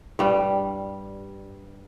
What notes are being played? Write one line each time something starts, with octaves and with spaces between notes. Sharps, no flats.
G2 G3